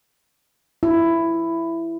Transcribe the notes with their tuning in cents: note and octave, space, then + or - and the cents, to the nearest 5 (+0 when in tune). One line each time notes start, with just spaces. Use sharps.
E4 +10